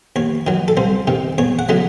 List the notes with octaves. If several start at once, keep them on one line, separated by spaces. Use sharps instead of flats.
D#2 C#5
D#3 F#3
A4
C2 C5
C3 D#3
E2 C#5
F#5
C#3 F#3 A3